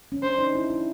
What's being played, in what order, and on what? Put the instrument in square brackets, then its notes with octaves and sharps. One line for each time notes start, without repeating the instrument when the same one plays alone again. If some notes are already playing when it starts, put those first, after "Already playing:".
[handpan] C#4
[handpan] D4 [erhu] C5
[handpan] D#4
E4
E4